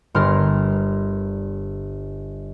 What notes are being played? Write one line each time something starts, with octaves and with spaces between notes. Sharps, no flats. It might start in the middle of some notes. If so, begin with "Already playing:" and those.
G1 G2 A#4 C6 F6